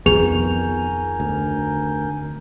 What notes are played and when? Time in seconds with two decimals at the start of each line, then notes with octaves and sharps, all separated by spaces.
0.06 F2 D#3 B3 G#4 A#4 G#5 G6 F7
1.20 D2